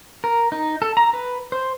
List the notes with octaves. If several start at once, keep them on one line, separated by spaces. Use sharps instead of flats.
A#4
D#4
A4
A#5
B4
C5